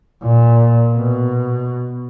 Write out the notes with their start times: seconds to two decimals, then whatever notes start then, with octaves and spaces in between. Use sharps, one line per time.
0.23 A#2
0.95 B2